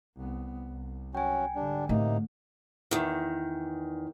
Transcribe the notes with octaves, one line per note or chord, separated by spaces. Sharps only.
C2 B3
C2
F#3 C#4 F#4 G5 G#5
G#2 D3 G3 D4
A2 C3 A#3 D#4
E2 D#3